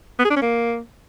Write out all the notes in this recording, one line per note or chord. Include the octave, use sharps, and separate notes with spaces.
B3
G#4
D4
C#4
A#3